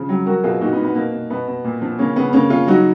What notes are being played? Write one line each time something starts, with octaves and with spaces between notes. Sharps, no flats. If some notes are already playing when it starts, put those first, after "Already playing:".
Already playing: C#3 F3
F#3
F#3 F#4 A#4
B2 F4 G#4
A#2 D#4 F#4
B3 D#4
A#2
B3
B2 A#3
B2
B2 B3
B2
A#2
F3
C#3 A#3 C#4
C#3 B3
C#3 A#3 C#4
C#3 C#4 F4
F#3 D#4 F#4